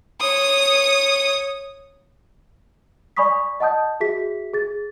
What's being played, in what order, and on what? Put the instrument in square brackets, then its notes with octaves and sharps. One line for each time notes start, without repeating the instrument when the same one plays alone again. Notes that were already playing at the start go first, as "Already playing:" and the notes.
[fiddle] C#5 D#6
[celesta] D5 G#5 B5 C#6 D#6 B6
D#5 F#5 A5 D#6 G6
F#4 G#4 E5 B6
G#4 A6